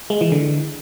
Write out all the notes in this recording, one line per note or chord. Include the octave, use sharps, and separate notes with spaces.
G#3
E3
D3